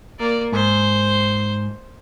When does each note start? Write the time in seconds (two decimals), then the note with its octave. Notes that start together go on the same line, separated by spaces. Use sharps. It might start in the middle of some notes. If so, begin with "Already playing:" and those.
0.19 A#3 D5
0.52 G#2 C5